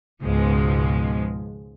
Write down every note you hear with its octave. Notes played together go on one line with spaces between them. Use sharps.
C#2 G#2 B2 F3 G#3